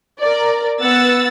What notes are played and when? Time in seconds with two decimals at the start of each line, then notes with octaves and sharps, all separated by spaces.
0.21 A#4 D5
0.81 B3 F#5 E6 A6